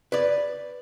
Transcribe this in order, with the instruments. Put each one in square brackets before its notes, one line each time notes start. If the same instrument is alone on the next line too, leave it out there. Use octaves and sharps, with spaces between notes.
[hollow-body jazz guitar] B4 D5